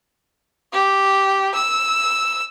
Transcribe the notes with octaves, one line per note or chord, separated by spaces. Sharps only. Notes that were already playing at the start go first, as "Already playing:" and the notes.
G4
E6